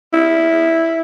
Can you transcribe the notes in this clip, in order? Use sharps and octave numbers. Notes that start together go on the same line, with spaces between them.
E4